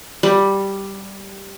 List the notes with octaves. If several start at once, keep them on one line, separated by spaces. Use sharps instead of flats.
G3